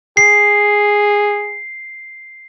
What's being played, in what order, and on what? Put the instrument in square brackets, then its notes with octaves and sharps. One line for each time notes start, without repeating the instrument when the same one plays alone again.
[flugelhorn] G#4 [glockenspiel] C7